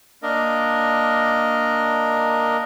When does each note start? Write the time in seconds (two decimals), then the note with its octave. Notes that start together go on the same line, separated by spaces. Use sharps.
0.23 A#3 D4 A#4 D#5